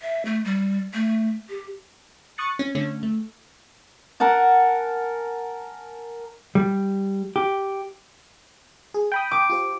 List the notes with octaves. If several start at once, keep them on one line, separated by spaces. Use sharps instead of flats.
E5
A3
G3
A3
G4
C#6 D#6 F#6 A6 C#7
C#4
D3 A3 C#4
A3
A#4 F#5 G#5 A5
G3
G4
G#4
G5 B5 D#6
D6
F4 G4 C5